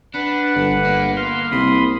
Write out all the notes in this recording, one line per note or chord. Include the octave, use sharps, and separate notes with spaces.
D4 B4 F#5
G1
A#3
C6 F6
C2 B5 C6 D#6